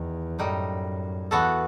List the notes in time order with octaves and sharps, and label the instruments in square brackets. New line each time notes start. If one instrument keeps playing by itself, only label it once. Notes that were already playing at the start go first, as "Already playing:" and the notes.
Already playing: [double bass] E2 [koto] D#3
[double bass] F#2 [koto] A2 G3 D#4
[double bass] E2 [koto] E3 B3 F#4 A4